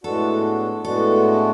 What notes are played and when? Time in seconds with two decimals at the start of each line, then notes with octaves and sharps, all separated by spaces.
0.04 A2 G#3 B3 D4 F#4 A4
0.85 A2 G#3 B3 D4 F#4 A4